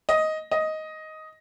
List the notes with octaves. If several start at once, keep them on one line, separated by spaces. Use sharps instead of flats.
D#5
D#5